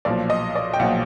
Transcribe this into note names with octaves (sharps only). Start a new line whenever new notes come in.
B1 A#2 F3 D5
D#5
D5
G5
B1 A#2 F3 F#5